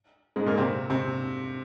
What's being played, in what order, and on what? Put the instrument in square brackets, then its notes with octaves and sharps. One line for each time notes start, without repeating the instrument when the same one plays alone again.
[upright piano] G#2 G#3
A#2 A#3
C3 C4
C3 C4